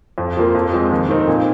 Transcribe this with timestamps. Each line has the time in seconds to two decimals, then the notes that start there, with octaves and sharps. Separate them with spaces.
0.18 F2
0.37 F3 A#3 F4
0.55 F2
0.73 F3 G#3 C4
0.91 D#2
1.09 D#3 C4 D#4
1.27 A#2